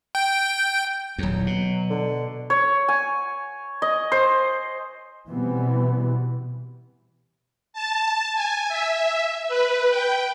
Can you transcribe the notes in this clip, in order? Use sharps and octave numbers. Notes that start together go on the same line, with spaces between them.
G5
D#1 E2 F#3
B2
D3
C#5
G#5
D#5
C5
B2 E3 G3 B3 C4
A5
G#5
E5
B4
G5